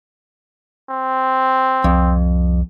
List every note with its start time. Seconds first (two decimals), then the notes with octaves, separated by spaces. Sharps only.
0.90 C4
1.84 C2 F2